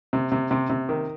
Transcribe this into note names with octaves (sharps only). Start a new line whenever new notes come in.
C3
C3
C3
C3
D#3